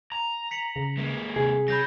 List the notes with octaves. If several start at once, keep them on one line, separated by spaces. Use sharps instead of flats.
A#5
B6 C#7 F#7
C#3
G#3 A#3
C3 G#4
F#3 B5 G6 A#6